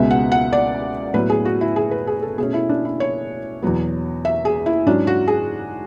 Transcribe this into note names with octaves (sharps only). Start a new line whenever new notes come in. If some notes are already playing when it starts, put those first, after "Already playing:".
Already playing: C#2 B2 G#3 B3 E5
F#5
F#5
D5
A2 F#3 B3 B4
G#4
F#4
E4
G#4
B4
G#4
A4
B2 A3 C#4 G#4
E4
D4
E4
C#5
E2 B2 F#3 B3
E5
G#4
E4
G#2 F#3 C#4 D4
F#4
G#4